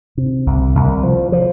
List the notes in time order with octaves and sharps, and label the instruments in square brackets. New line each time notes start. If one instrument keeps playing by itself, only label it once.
[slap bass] C3
C2
C2
F3
F3